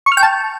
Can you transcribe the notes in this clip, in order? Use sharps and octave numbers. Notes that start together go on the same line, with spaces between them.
C#6
F6
G5
A5